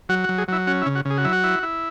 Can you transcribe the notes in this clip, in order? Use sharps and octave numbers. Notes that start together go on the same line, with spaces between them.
F#3 F#4
F#4
F#3
G#4
F#3 E4
C#4 F#4
E4
C#3
F#4
C#3
G#4
F#4
F#3 E4
F#4
E4
E4